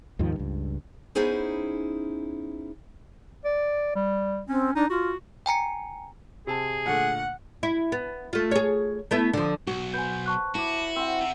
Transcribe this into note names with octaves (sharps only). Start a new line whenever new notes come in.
D#2 G#2 D#3 F3
C#2 G2
B3 C#4 D#4 E4 G#4 C5
D5
G3
C4 C#4
D4 D#4
F4 F#4
G5 G#5 A#5 C#7
C3 G#4 A5
A#2 D3 A3 F#5
E4
B3
A3 F4
G#4 C#5
A3 B3 E4
D3 F3
B1 F#4
B4 C5 G#5 G6
A5 C#6 F#6
E4 F#4 A5 D6
C4 F#5 E6
C3